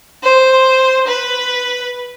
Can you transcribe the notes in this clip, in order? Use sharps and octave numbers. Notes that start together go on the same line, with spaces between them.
C5
B4